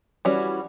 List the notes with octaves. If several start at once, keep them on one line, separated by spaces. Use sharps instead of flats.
E3 G3 C#4 F#4